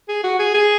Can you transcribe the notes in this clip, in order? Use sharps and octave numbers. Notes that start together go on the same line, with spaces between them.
G#4
F#4
G#4
G#4